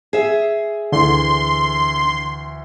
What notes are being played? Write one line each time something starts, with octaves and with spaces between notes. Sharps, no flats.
G#4 E5
D2 D3 E3 C6